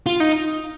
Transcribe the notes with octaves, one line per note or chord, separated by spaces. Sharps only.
F4
D#4